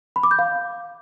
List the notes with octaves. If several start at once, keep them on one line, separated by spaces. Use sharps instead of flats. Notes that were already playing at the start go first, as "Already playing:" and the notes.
B5
D6
G6
F5